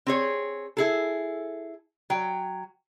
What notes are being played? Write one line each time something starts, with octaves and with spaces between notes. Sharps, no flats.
C4 G#4 C#5
E4 G#4 A4
F#3 G5